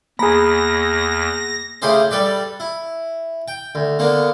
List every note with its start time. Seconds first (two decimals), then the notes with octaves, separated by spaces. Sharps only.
0.19 E2 A#3 G#4 B5 A#6
1.82 C#3 A3 E4 G4 G#4 C5
2.11 G3 A4 B4 D5
2.60 E4
3.48 G5
3.75 D2
3.99 D3 A#3 B3